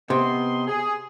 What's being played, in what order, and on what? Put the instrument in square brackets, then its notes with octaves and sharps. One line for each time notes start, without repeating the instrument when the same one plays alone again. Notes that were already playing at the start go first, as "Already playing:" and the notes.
[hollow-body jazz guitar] C3 [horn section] B3 D#5 C6
[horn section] G#4